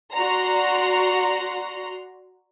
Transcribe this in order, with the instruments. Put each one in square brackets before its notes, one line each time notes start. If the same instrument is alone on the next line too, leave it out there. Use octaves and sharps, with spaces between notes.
[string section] F#4 D5 F#5 A#5 C6